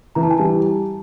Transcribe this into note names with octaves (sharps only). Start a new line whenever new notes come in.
E3 A#5
A5
G#5
G3 A5